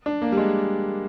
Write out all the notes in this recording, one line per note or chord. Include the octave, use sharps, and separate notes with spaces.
D4
A#3
G3
G#3